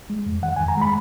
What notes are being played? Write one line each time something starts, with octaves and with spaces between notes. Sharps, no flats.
G#3
F2
D#3 F#5
G#5
F2
A#5
G#3 B5